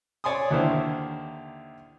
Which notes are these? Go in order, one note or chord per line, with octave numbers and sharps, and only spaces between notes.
C#5 D5 G#5 C6 D#6
D#2 D3 D#3 E4 C5